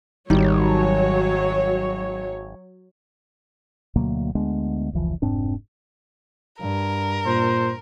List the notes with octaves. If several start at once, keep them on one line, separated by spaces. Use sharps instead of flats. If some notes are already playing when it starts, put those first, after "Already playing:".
G#1 D#3 F#3 G3 D#4 C#5
D2 B2 F#3 A#3
D2 G#3 B3 D4
F1 C#2 E3 F3
F1 G#2 C4 D4
G2 A#4
A#2 C5